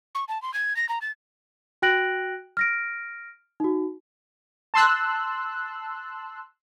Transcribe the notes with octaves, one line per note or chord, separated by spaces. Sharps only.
C#6
A5
C6
G#6
A#6
A#5
A6
F#4 G5 F#6 A#6 D7 F#7
F6 A#6 D7
D#4 F#4
A5 C6 E6 F#6